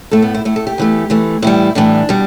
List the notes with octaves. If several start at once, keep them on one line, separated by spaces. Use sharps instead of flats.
A2 A3 A4
B3
E4
A2 A3 E4
A4
G4
E2 E3 A3
E2 E3 A3
A2 E3 G3 E4
A2 E3 G3 D4
B2 G3